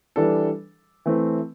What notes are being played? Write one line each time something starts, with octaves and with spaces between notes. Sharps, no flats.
E3 G3 D4 A4
E3 A3 C4